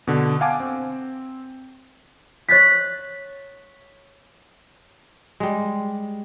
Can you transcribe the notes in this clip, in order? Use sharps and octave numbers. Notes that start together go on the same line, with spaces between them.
B2 D3
F5 F#5 G#5 A5 D6
C4
C#5 F#6 A6 B6
G3 G#3